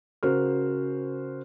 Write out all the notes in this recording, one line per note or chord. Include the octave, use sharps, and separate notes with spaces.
C#3 F#4 A#4 C5 F6